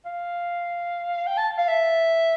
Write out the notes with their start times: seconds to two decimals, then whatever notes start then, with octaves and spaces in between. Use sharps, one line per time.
0.05 F5
1.27 G5
1.37 A5
1.58 F5
1.68 E5